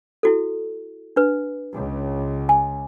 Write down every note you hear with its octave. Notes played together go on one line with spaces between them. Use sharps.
E4 F#4 A4
D4 B4
C#2
G#5